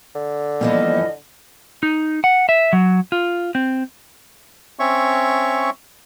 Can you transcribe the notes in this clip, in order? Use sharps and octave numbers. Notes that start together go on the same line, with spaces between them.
D3
E3 F3 G3 A#3 B3 D#5
D#4
F#5
E5
F#3
F4
C4
C4 C#4 C#5 E5 C#6